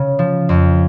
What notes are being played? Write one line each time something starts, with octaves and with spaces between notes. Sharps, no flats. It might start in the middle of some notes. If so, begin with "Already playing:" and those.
Already playing: C#3
F3
F2